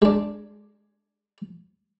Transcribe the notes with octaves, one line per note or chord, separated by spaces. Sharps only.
G#3 D4